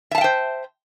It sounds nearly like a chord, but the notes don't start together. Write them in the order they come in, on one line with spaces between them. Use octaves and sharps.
E5 A5 F5 G5 C5